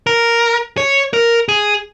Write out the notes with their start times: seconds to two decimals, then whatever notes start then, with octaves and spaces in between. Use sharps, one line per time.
0.07 A#4
0.77 C#5
1.14 A#4
1.49 G#4